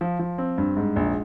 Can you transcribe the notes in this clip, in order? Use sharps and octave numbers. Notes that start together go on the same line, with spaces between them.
F3
F3
C4
G2
G#2
A#1